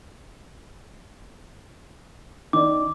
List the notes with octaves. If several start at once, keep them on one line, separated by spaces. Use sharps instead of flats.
D#3 D5 D6